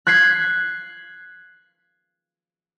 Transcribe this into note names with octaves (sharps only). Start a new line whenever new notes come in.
F#6 G#6 B6 C7